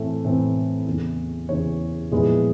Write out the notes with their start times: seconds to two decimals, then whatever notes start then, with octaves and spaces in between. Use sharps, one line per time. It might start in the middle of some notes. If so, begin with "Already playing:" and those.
Already playing: A2 E3 A3 C4
0.25 A2 E3 A3 C4
0.87 E2 C#3 E3
1.48 E2 C#3 E3 C#5
2.11 A#2 F3 G#3 B3 E4